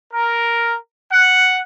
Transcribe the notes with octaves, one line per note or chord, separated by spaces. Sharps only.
A#4
F#5